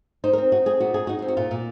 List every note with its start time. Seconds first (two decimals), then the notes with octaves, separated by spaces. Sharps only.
0.24 D#4 C5
0.33 A#4
0.38 C4
0.52 D#4 F#4
0.66 C4 G#4
0.80 A#2 F#4
0.94 D#4 G#4
1.07 D#4 F#4
1.19 C4 G#4
1.28 F#4
1.37 A#2 F4
1.51 A#2